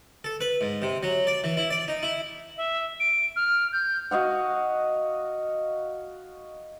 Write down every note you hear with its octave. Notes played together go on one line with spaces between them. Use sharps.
A4
B4
G#2
C3
F#3
D5
E3
E4
D5
D#4
E4
E5
D7
F6
G6
F#4 D#5 F5 F#5